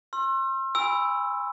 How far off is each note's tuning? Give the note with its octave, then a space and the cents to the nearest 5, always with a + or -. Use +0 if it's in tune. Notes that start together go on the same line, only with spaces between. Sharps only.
C6 +35 E6 +40
G#5 -30 B5 +15 E6 +0